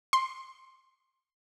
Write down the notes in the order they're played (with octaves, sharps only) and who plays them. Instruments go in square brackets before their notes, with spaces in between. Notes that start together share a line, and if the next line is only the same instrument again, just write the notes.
[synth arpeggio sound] C6